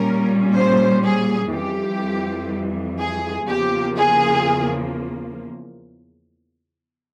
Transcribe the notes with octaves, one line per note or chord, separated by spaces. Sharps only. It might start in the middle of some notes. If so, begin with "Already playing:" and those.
Already playing: A#2 G3 A#3 C#4 A#4
C5
G#4
F2 E3 G3 G4
G#4
E2 C#3 F3 A#3 G4
G#4